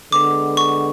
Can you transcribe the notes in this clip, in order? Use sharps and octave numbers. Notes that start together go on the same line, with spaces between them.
D3 G#3 B3 D6
C#6